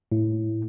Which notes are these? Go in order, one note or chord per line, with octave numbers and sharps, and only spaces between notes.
A2